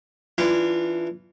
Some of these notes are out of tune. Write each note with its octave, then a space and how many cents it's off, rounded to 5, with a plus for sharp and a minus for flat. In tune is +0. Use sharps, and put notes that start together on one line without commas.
E3 +0 D4 +0 F4 -20